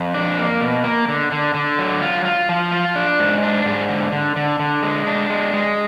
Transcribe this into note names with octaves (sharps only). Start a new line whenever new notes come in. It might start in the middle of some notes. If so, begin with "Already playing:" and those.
Already playing: F2
D4
A#3
B2
A#3
D3
D3
D3
F#3
F4
F4
F3
F4
D4
G#2
D4
G#2
D3
D3
D3
D3
G#3
D4
G#3
G#3